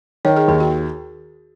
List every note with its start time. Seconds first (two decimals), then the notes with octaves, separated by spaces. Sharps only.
0.25 D#3 C#5
0.36 G#4
0.48 D#2 G#4
0.60 F#4